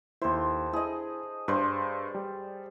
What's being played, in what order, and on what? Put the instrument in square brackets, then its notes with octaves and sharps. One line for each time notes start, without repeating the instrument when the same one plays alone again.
[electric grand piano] D#2 E4 [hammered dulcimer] A4 C5
[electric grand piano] E4 [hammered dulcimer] G#4 D#5
[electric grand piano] G2 [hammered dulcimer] C5 D5
[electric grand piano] G3